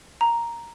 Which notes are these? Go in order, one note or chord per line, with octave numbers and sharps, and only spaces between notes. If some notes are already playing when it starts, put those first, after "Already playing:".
A#5